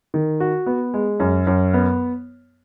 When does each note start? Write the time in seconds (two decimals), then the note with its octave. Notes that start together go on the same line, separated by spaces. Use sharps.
0.14 D#3
0.40 F#4
0.66 B3
0.94 G#3
1.20 F#2
1.47 F#2
1.74 B3